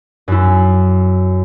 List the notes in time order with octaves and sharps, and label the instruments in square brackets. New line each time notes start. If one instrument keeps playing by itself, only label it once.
[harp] F#2 E4